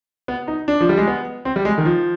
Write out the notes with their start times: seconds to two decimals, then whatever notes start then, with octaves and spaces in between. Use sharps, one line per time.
0.28 B3
0.48 D#4
0.68 D4
0.81 F3
0.89 G3
0.97 G#3
1.07 B3
1.45 C4
1.56 G3
1.65 G#3
1.78 D#3
1.85 F3